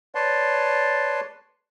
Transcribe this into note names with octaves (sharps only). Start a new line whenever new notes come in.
B4 C#5 D5 A5 C6